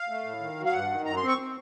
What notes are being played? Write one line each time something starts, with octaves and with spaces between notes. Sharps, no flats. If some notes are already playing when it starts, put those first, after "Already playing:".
Already playing: F5
A3
A2
D#3
F#3
F5
G2 F#5
D#3
F#2 A#5
C6
C4
C#6
C4